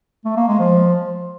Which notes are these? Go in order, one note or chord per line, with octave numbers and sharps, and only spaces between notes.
A3
A#3
G#3
F3